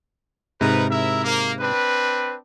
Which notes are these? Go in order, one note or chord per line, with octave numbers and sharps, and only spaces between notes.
G#2 C3 D#4 A#4 B4
E4 A#4 E5
A#3
C4 D4 B4